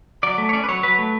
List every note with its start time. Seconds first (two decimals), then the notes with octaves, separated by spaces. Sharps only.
0.23 F#3 D5
0.38 A3
0.49 C#5
0.53 C#4 D5
0.64 B4
0.69 F#3 C#5
0.83 F#3 B4
0.98 A3